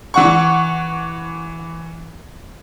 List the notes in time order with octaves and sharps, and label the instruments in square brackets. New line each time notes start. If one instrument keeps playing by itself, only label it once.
[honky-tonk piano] E3 F#5 C#6